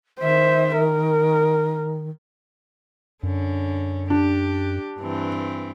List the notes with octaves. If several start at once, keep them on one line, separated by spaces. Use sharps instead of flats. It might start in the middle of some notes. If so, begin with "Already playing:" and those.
D#3 C5 E5
A#4
F#2 D3 C#4
D4 G4
G2 E3 C4